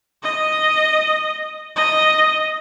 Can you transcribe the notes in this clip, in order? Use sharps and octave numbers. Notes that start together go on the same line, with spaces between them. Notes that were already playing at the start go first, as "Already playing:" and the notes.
D#5
D#5